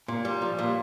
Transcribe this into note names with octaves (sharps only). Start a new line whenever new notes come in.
A#2
G3
F3
A#2